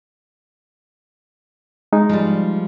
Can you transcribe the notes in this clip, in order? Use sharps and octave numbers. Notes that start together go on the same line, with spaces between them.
G#3 D#4
F3 G3